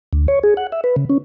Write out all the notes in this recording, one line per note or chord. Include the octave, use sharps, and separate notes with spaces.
D2
C#5
G#4
F#5
E5
B4
C#3
C#4